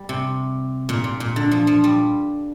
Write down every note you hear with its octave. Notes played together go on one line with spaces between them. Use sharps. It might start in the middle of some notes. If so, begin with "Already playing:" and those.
Already playing: G3
C3
A#2
A#2
A#2
D3
F3
F3
G3